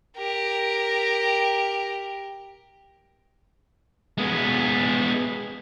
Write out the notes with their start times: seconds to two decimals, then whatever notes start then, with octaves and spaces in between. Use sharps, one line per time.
0.17 G4 A#4
4.18 G#3 B3